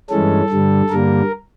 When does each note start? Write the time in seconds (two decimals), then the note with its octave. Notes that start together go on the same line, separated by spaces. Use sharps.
0.09 G2 E3 G#3 C#4 A4
0.50 G2 D3 G3
0.90 G2 D3 G3 A#3 A#4